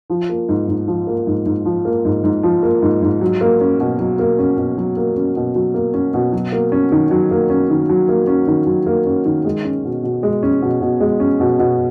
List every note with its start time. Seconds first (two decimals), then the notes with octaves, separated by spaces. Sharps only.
0.10 F3
0.29 A#3
0.49 G#2
0.68 G#2
0.87 F3
1.07 A#3
1.27 G#2
1.46 G#2
1.65 F3
1.85 A#3
2.05 G#2
2.24 G#2
2.43 F3
2.63 A#3
2.82 G#2
3.03 G#2
3.21 F#3
3.41 A#3
3.61 C#4
3.80 B2
4.00 F#3
4.19 A#3
4.39 C#4
4.57 B2
4.78 F#3
4.97 A#3
5.16 C#4
5.36 B2
5.55 F#3
5.74 A#3
5.94 C#4
6.14 B2
6.33 F#3
6.52 A#3
6.72 C#4
6.92 D#3
7.11 F#3
7.31 A#3
7.50 C#4
7.70 D#3
7.90 F#3
8.09 A#3
8.27 C#4
8.47 D#3
8.67 F#3
8.86 A#3
9.06 C#4
9.25 D#3
9.45 G#3
9.64 C#4
9.84 B2
10.03 B2
10.23 G#3
10.43 C#4
10.62 B2
10.81 B2
11.00 G#3
11.20 C#4
11.40 B2
11.59 B2